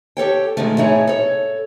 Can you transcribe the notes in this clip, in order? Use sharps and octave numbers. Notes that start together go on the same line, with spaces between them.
G4 A4 C#5 G5
B2 D#3 F3 G#3 A3
A2 A3 D#4 E4 G#4 C#5
A4 C#5